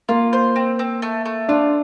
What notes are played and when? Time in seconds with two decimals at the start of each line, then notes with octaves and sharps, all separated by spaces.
0.09 A#3 F4
0.33 C5
0.56 C4
0.79 C4
1.02 A3
1.25 A3
1.48 D4 F4